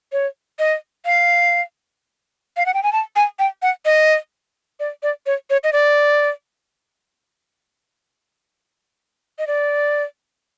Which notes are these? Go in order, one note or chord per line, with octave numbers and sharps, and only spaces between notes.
C#5
D#5
F5
F5
F#5
G5
G#5
A5
G#5
G5
F#5
D#5
D5
D5
C#5
C#5
D#5
D5
D#5
D5